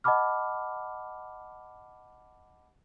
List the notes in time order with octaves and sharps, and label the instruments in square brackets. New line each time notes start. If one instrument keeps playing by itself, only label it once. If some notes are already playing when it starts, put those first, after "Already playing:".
[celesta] D#5 F#5 A5 B5 D6 F6